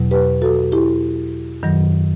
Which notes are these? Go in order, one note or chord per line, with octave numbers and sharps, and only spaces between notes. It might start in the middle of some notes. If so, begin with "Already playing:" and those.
Already playing: E2 B2 F#3
G4 B4
F#4 A4
E4 G4
F#2 D#3 F#3